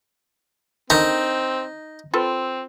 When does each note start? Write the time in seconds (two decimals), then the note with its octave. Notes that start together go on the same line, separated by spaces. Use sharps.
0.90 D3 D#3 C4 D#4
2.14 C4 F4 A4 B4